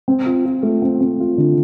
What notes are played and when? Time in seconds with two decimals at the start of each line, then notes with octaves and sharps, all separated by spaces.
0.08 C4
0.26 F4
0.45 F4
0.63 A3
0.82 C4
1.01 C4
1.20 F4
1.38 D3